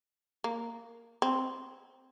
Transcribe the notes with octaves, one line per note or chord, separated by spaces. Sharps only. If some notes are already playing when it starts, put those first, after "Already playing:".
A#3
C4